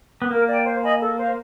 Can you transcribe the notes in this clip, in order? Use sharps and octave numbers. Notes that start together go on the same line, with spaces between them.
B3
A#3 A#4
D5 G5
C5
D#5 G#5 B5
A4
C5 F5